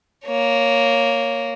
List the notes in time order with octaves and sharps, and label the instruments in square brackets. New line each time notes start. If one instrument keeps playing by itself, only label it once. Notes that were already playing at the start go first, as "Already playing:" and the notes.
[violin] A#3 C#5